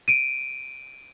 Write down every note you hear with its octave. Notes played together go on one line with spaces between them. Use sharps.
D7 D#7